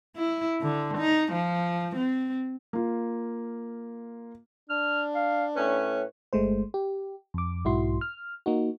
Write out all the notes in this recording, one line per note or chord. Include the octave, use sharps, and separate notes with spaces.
E4
D3
D#4
F3
C4
A#3 F4
D4 F6
F5
A2 C#4 B4
G1 G#3 A3 C5
G4
F2 D6
B1 G#2 E4 F#4 C6
F6
A#3 D#4 F#4